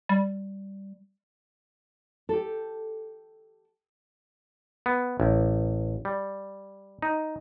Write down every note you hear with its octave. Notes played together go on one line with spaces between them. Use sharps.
G3
G4 A4
B3
A1
G3
D#4